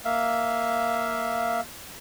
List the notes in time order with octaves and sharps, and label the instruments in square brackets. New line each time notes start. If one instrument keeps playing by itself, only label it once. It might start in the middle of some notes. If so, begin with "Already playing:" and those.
[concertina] A#3 E5 F5